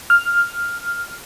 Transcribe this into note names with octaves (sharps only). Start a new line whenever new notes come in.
F6